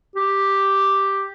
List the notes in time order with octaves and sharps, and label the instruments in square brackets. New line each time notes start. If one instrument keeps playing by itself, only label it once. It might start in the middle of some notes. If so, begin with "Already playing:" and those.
[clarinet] G4